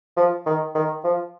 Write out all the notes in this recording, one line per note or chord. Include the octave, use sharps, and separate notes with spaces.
F3
D#3
D#3
F3